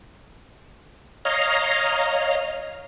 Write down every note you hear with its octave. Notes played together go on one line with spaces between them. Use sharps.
C#5 D#5 F5 A#5